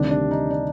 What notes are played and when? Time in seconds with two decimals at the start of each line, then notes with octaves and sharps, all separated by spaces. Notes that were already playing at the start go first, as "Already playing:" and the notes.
Already playing: D2 C3 D#3 G3 D4
0.11 D4
0.31 D#4
0.50 D4